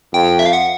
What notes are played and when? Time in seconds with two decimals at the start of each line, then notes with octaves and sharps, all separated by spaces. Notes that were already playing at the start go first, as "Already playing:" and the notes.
0.14 F2 G5
0.39 E5
0.46 F5
0.53 F#5